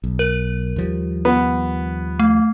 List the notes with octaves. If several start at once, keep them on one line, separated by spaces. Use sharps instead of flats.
B1
A#4
D#2 F3 G3
B3
A3